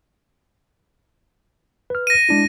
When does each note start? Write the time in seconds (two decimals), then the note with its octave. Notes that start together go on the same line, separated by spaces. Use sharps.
1.90 B4 F6
2.07 A#6 D#7
2.29 G#3 D4 E4